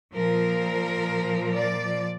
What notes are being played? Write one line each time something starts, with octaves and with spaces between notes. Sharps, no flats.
A#2 F3 A#4
D5